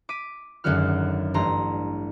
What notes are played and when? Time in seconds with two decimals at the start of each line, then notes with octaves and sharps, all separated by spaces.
0.09 D6 B6 D#7
0.64 G#1 F#2 D3 F#3 F#4 F6
1.34 A1 G2 A3 A#5 C6